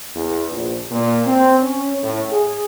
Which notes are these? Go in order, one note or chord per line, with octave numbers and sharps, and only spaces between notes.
E2
A#1
A#2
C4
C#4
A2
G#4